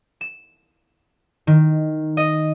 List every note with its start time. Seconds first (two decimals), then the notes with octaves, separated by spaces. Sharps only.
0.21 E7
1.47 D#3
2.17 D#5